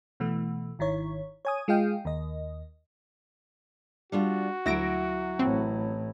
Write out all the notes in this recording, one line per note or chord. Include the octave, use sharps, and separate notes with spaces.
B2 E3 A3
G#1 D#3 E4 C#5
C#5 G#5 D#6
G#3 F4 G#4 D#5 F5 G5
D#2 D#5
G3 D4 F4 F#4
D2 F#3 E4 A#6 D7
A1 A2 C4